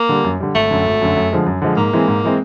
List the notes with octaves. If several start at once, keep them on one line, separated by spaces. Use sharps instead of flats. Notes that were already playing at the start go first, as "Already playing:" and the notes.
Already playing: A#3
D3 G3
F#2
D3 G3
G#1 A3
F#2 D3
G#1
F#2 D3
F#2
D3 F3 G#3
F#2
D3 F3 G#3
G#2 A#3
E3 G#3 C4
G#2
E3 G#3 C4